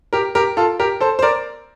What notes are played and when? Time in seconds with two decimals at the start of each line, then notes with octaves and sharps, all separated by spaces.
0.13 G4 A#4
0.35 G4 A#4
0.57 F4 A4
0.79 G4 A#4
1.01 A4 C5
1.19 C5
1.22 A#4 D5